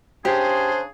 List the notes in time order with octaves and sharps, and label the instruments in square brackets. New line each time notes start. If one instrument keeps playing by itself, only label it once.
[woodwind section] C#3 D4 G#4 [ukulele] G4 [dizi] C5